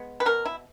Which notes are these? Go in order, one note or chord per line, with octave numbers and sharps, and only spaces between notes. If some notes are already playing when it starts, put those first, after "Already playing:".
Already playing: G#3 B3
B4
B2 A#4
E4